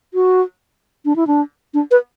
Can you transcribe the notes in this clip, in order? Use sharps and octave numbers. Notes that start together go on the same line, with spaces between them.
F#4
D4
E4
D4
D4
B4